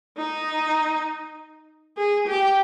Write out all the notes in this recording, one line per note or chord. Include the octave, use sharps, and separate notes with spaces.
D#4
G#4
G4